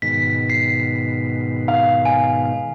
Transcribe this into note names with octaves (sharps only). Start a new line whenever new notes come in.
G#2 B2 D#3 B6
C7
F5
G#5